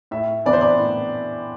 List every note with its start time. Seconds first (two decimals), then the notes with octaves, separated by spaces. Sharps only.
0.11 A2 E5
0.45 E3 B3 D4 D5
0.53 C5
0.61 D5
0.79 A2